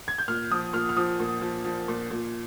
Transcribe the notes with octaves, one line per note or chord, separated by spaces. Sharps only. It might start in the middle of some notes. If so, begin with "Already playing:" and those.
G#6
G6
A#2 F6
F3 D#6
A#2 F6
F6
F3 D#6
A#2
F3
F3
A#2
A#2